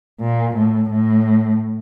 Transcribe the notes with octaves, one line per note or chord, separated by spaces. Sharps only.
A#2
A2
A2